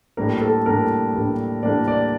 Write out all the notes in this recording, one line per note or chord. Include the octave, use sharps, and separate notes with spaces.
A2 G3 A#3 D4 A#4
A4
A2 G3 A#3 D4 A#4
A2 G3 A#3 D4
A2 G3 A#3 D4 D5
D5